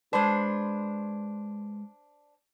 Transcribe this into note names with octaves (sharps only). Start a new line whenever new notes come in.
G#3 D4 B4 C5